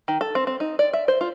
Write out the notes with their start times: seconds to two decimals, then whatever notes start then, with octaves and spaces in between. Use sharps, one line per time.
0.08 D#3
0.21 A4
0.35 C4
0.47 C4
0.60 D#4
0.79 D5
0.93 E5
1.08 C5
1.21 F4